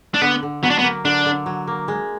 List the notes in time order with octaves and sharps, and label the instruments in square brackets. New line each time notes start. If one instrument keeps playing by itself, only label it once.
[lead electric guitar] D4
[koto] D3 [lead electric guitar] B3
[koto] D3
[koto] F#3 [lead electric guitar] B3
[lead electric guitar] D4
B3
[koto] A#3
[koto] D3 [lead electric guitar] D4
[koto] D3
F#3
A#3
G#3